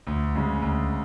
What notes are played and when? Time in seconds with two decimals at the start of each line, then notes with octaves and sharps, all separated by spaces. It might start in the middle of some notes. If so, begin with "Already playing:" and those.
0.07 D2
0.35 C#3 G#3
0.62 D2